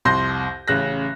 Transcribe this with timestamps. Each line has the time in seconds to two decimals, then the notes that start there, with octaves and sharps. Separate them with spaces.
0.05 C2 F2 C6 G6 A#6
0.68 A1 C#3 F#6 A#6